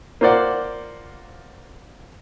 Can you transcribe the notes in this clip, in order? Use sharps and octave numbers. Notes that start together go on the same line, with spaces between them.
A#3 F4 C5 D5 F#5